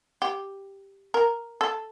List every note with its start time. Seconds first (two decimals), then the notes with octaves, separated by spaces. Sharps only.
0.22 G4
1.14 A#4
1.61 A4